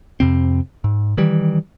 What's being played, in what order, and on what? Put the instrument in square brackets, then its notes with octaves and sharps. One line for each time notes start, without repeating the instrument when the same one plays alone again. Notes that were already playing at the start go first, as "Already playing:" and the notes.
[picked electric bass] F2 C3 C4
G#2
D#3 E3 G3